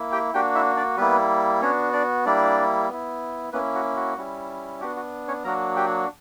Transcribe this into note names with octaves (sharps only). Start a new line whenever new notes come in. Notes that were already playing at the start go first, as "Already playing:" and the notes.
Already playing: A#3 E4
G4 G5
A#3 D4 F#4 G4 G5
E4 E5
D4 D5
G3 A#3 B3 E4 B4
B3 C#4 D4 F#4 C#5
D4 D5
G3 A#3 D4 E4 D5
B3 E4
A#3 B3 C#4 E4 B4
F#4
F#4
G3 C#4 E4
B3 D4 F#4 G4
F#4
C#4 C#5
F#3 A#3 D4 F#4 A#4 A#5
G4 G5